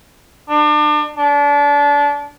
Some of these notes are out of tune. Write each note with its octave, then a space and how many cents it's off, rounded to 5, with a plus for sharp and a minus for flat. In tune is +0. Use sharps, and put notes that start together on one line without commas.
D4 +35
D4 -30